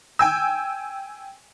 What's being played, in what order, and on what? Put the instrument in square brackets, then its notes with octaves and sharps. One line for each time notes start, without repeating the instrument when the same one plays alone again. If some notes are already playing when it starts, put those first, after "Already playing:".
[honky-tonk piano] G5 G#5 E6